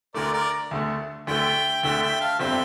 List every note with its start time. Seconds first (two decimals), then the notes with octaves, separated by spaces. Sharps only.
0.14 D2 D3 A3 A#4 D5
0.33 A#4 D5
0.71 D2 D3 A3
1.27 D2 D3 A3 E5 G5
1.83 D2 D3 A3 E5 G5
2.02 E5 G5
2.21 F5 A5
2.39 G1 F2 D3 G3 C4 E5 G5